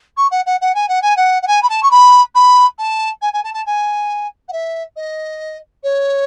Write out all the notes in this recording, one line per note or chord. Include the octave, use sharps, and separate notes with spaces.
C#6
F#5
F#5
F#5
G#5
F#5
G#5
F#5
F#5
G#5
B5
A5
C#6
B5
B5
A5
G#5
G#5
A5
A5
G#5
F#5
E5
D#5
C#5